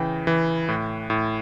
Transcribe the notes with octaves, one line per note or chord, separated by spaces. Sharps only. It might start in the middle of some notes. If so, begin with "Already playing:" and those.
Already playing: C#3 E3 G5
E3
A2
A2